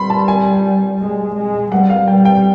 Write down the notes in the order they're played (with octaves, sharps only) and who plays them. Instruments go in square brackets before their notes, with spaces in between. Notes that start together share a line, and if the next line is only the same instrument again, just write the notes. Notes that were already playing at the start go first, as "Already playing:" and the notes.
Already playing: [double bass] G3 [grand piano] B5 C6
[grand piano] A5
G#5
[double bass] G#3
G#3
[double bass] G3 [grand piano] F#5
[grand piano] F5
[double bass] G3 [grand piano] G5
[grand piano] G5